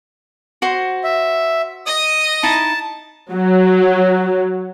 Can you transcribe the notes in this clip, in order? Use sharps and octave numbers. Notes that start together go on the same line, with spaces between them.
F#4 C5
E5
D#5 D#6
D#4 E4 A5
F#3